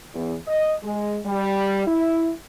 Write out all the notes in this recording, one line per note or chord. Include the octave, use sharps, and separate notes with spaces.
E2
D#5
G#3
G3
E4